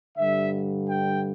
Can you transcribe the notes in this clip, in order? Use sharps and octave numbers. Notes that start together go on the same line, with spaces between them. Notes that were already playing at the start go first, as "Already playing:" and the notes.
G2 D3 G3 E5
G5